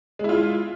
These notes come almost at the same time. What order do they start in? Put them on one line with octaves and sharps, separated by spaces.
G#3 E4 F4